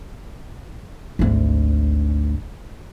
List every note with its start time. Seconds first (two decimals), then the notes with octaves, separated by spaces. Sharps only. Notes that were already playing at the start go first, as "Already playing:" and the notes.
1.19 G#1 D2